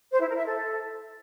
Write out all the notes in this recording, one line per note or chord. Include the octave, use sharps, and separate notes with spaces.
C5
E4
A#4
E5
A4